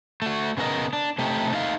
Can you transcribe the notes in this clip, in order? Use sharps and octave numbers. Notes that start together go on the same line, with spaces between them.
A3 F#4
C#3 B3 C#4 A#4 D#5
D4
C3 A3 D#4 G4
A3 D4 D#4 F5